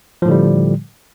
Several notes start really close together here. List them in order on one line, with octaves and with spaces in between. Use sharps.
F3 A2 D3 G3